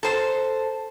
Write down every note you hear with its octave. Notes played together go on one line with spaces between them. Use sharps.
A4 C5